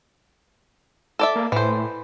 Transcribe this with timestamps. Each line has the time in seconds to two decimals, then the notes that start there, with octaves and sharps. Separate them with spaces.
1.19 A4 D5 E5
1.36 A#3
1.52 A2 E3 C5